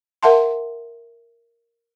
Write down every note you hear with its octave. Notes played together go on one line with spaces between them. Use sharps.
A#4 E5 F#5 A5 C6